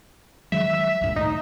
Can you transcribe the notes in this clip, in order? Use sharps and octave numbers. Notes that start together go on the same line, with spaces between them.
D#3 F#3 G#3 E5
C#2 G2 A#2
A2 D#4